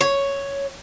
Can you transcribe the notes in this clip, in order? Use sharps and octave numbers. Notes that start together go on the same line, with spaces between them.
C#5